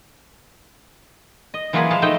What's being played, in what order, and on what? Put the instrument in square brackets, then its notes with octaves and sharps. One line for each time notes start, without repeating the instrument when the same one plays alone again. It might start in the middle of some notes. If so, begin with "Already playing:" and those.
[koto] D#5
E3 F#3 A#3 F4 G#4 B4
F3 G#3 F5 A5
A3 D#4 C5 D#5 G5